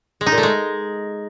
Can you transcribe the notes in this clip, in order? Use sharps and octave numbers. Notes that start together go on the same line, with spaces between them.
G#3
D#4
A#2
A3
G#3